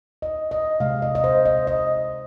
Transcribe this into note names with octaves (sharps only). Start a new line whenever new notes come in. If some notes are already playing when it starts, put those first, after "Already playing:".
D#5
D#5
C3 G#3 F5
D#5
D#5
C5
D#5
D#5